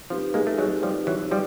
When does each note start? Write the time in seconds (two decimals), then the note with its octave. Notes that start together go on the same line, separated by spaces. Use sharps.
0.10 F3 C4 D#4 G4 B4
0.34 G#3 A#3
0.47 A3
0.58 F#3 G#3
0.83 F3 G3
1.07 E3 F#3
1.31 F3 G3